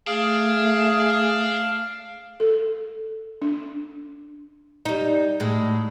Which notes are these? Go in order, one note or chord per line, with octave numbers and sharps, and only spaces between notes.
A3 D4 G#4 F5
A4
D4
G3 D#4
A2 G#3